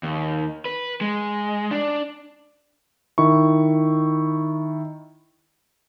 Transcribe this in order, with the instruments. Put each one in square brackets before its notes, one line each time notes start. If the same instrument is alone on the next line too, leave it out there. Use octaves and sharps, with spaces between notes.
[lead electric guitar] D#2
B4
G#3
D4
[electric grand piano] D#3 E4 C#6